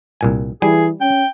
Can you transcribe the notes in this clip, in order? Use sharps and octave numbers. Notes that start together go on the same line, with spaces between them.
C2 A#2 G#5
E3 G3 G#4 G#5
C#4 G5